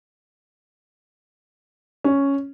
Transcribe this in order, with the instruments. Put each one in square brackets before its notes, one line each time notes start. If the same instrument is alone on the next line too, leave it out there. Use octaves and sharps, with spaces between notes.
[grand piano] C#4